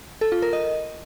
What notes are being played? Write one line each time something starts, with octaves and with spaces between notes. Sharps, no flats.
A4
F4
A#4
D#5